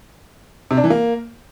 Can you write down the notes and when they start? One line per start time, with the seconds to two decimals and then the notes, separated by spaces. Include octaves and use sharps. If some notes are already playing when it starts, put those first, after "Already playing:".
0.71 C3
0.77 D4
0.84 E3
0.90 A#3